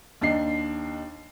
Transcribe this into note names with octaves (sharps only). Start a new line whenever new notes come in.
D#2 D4 D#4 C7